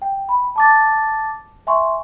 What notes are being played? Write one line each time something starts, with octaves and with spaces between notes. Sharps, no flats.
G5
B5
A5 D6 A6
E5 G#5 C6 C#6